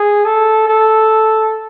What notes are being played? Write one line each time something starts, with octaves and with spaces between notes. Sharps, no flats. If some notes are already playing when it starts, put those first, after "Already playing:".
Already playing: G#4
A4
A4